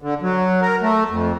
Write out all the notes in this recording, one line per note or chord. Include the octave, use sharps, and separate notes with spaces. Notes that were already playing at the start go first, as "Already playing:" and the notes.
D3
F#3
A#4
A3
F2